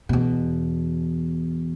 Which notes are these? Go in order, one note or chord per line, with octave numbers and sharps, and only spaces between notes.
E2 B2